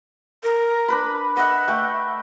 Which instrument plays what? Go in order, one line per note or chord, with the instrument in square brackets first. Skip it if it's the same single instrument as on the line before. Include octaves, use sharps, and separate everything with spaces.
[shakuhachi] A#4
[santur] D4 B4 B5
[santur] D#5 E5 [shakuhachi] F#5
[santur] A3 G5